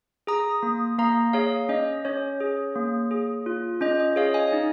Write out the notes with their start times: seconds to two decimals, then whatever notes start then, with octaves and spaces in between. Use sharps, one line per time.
0.27 G#4 A#5 D#6
0.63 A#3
0.98 A#3 F5 A#5
1.33 G#4 C#5 F5
1.69 C#4 D#5
2.05 C#4 C#5
2.40 G#4
2.76 A#3
3.11 G#4
3.46 F4
3.81 C#4 D#5
4.00 D#5
4.16 G#4 C#5 F5
4.34 D#5 G#5
4.53 D#4